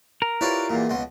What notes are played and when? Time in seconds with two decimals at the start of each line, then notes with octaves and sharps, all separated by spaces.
0.22 A#4
0.41 E4 F4 G4 B4 C#5 D5
0.70 E2 A#2
0.89 C#2 B2 C6